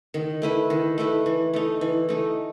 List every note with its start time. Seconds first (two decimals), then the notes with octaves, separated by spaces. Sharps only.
0.14 D#3
0.42 A3 E4 B4
0.70 D#3
0.98 A3 E4 B4
1.26 E3
1.53 A3 D#4
1.81 E3
2.09 A3 D#4